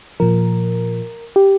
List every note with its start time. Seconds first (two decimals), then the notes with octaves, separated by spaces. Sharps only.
0.20 A#2 F3 A#4
1.36 G4